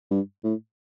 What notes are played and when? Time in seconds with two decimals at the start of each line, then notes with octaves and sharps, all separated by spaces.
0.11 G2
0.44 A2